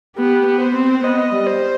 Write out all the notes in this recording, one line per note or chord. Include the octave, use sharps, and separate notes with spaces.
B3 G4
B3
C5
C4
B3 D#5
G3
C5